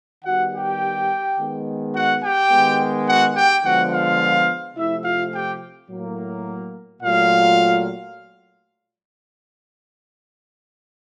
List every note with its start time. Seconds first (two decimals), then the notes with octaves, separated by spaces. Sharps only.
0.24 D#3 G3 B3 F#4 F#5
0.52 G4 G5
1.37 D#3 G#3 B3
1.94 F#4 F#5
2.22 G4 G5
2.50 D#3 G#3 B3
3.07 F#4 F#5
3.35 G4 G5
3.63 D3 F3 G#3 B3 F#4 F#5
3.91 F4 F5
4.76 C3 F3 A3 E4 E5
5.04 F4 F5
5.32 G4 G5
5.89 A2 F#3 A#3
7.02 A#2 F#3 A3 F4 F5